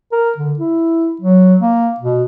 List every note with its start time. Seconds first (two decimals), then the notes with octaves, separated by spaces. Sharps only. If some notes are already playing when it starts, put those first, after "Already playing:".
0.12 A#4
0.38 D3
0.59 E4
1.21 F#3
1.61 A#3
2.00 B2